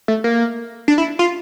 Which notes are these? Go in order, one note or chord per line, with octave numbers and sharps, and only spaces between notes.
A3
A#3
D4
E4
F4